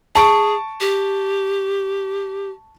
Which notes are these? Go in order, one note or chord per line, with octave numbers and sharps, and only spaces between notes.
G#4 A5 C#6 D7
G4